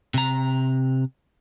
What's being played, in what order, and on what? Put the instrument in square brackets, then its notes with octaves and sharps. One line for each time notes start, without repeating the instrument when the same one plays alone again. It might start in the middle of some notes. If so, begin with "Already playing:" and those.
[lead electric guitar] C3 A#5